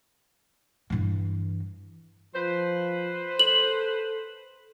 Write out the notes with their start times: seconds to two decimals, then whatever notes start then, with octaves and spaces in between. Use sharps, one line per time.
0.90 G2 E3
2.35 F3 B4 C5
3.39 A4 F#7